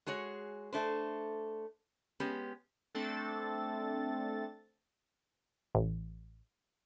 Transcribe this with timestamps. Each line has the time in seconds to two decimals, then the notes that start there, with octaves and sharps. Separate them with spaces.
0.06 G#3 F#4 G#4 C#5
0.73 A3 D4 C5
2.20 G#3 B3 C#4 G4
2.95 A3 C4 D4 A4 A6
5.75 A1